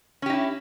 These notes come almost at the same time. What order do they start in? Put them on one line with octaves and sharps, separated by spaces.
C#4 G4 D#4 E4